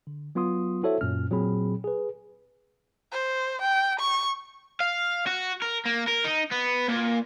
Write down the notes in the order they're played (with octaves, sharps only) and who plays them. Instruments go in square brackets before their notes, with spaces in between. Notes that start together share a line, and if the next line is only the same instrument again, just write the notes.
[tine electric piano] D3
F#3 B3 F4 C6 D#6
E4 F#4 A4 C5 C#5 E5
F#2 A#2 C#4 F6
A#2 F#3 C4 G#4 B5
G#4 B4
[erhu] C5
G5
C#6
[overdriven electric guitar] F5
F#4
A#4
A#3
A#4
D#4
B3
A#2